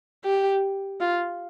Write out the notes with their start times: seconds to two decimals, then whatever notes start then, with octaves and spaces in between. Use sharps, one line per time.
0.25 G4
1.01 F4